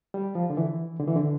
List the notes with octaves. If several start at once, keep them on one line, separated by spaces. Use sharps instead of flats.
G3
F3
D3
E3
D3
E3
D3